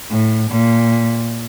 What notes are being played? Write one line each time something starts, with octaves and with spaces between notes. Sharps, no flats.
A2
A#2